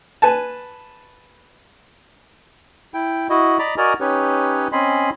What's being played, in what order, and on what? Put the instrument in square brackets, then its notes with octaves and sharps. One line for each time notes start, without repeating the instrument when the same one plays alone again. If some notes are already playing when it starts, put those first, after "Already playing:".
[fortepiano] B4 G#5 A5
[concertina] E4 G5
E4 F#4 D#5
D5 D#5 A#5 B5 D6
F#4 A#4 D5 D#5 G#5 A#5
C#4 D#4 G4 B4 C#5
C4 C#4 D#5 G#5 B5 C6